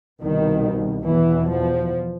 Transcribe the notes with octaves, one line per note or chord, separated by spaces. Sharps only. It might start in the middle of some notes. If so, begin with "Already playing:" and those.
C2 B2 D#3
E2 B2 E3
F3